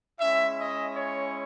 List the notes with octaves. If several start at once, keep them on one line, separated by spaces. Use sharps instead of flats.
G#3 C#4 E4 E5
D#5
C#5